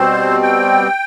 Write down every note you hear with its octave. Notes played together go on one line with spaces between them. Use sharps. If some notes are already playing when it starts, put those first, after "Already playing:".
Already playing: B2 G3 C4 C5
G5